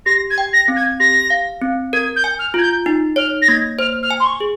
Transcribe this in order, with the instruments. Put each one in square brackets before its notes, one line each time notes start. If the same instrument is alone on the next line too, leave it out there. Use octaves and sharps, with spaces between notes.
[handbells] G4 [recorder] A#6
[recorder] G#6
[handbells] G5
[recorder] A#6
[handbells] C4
[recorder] G#6
[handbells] G4 [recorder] A#6
[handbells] F5
C4
[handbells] A#4 [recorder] G#6
[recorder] G6
[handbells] G#5
[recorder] F6
[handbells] F4 [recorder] G#6
[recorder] G6
[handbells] D#4
[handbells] C#5 [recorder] F6
[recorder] A#6
[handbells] A#3 [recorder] G#6
[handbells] C5 [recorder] F6
[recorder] F6
[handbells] G#5
[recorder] C6
C#6
[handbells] G#4